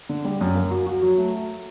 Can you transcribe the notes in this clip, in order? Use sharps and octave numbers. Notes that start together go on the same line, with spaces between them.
D3
G3
F#2
A#3
F#4
F#4
F#3
A3